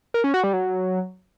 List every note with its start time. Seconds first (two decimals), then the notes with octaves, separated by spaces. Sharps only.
0.14 A#4
0.24 C#4
0.34 F#4
0.44 G3
0.53 F#3